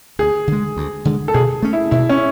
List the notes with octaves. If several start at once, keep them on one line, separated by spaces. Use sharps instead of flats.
D2 G#4
D3 G#3
D2
D3 G#3
A4
B2 G#4
A3 C#4
E4
B2 E4
C#4